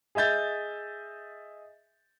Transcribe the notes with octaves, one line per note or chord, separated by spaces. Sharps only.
G#4 D#5 E5 G6 A6